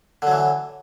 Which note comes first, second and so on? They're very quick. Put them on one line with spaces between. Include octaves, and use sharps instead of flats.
D3 F#3 E3